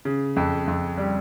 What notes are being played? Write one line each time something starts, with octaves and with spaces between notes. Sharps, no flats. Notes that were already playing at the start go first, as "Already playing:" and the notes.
C#3
F2
F2
G3